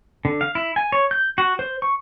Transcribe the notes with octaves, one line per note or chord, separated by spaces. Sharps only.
D3
F5
E4
G#5
C#5
G6
F#4
C5
C#6